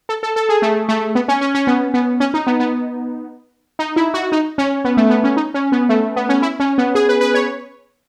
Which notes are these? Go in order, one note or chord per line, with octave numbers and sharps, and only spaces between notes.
A4
A4
A4
G#4
A3
A3
B3
C#4
C#4
C#4
B3
B3
C#4
D#4
B3
B3
D#4
E4
F#4
D#4
C#4
B3
A3
B3
C#4
D#4
C#4
B3
A3
B3
C#4
E4
C#4
B3
G#4
B4
B4
C#5